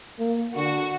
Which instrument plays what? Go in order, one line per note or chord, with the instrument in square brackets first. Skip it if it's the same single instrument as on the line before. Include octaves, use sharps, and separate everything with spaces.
[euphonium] A#3
[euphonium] D3 [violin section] F#4